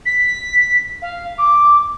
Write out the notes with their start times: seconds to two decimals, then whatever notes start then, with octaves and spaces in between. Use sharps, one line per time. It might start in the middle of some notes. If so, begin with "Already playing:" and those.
0.05 B6
1.02 F5
1.38 D6